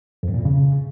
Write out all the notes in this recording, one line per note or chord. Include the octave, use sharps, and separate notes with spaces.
F2
G2
A#2
F2
C#3